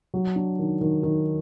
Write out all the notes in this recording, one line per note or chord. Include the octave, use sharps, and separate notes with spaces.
F#3
D4
D#3
D#3
D#3